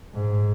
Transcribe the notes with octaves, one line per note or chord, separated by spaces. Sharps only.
G#2